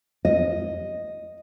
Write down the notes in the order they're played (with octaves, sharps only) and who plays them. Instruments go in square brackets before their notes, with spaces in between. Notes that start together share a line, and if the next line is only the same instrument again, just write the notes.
[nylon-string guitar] D#5